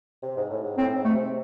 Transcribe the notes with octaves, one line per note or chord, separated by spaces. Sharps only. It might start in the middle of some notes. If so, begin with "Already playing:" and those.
C3
G#2
A2
G#2
A2 C4
G#2
A3
C3